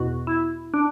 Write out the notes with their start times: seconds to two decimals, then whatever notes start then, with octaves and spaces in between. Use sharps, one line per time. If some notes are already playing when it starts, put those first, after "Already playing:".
Already playing: E2 B2 F#4
0.27 E4
0.74 D4